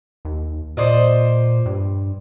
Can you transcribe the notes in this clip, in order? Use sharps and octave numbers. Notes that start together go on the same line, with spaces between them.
D#2
A#2 C5 D5 D#5
G2